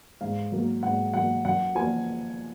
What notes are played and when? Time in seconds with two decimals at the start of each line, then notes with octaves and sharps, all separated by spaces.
0.21 G#2 F5
0.52 F#3 A#3
0.83 G#2 F#5
1.14 F#3 A#3 F#5
1.45 F#2 F#5
1.75 F3 A#3 G#5